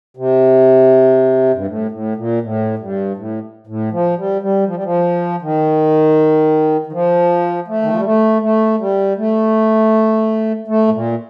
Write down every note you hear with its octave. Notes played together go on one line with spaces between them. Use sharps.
C3
G2
A2
A2
A#2
A2
G2
A2
A2
F3
G3
G3
F3
G3
F3
D#3
D#3
F3
A3
D#3
F3
G3
A3
A3
G3
A3
A3
A2
A#2